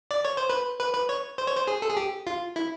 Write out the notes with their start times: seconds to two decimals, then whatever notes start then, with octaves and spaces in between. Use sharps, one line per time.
0.11 D5
0.25 C#5
0.37 C5
0.50 B4
0.79 B4
0.94 B4
1.09 C#5
1.38 C5
1.47 C#5
1.57 C5
1.67 G#4
1.82 A4
1.89 G#4
1.97 G4
2.27 F4
2.56 E4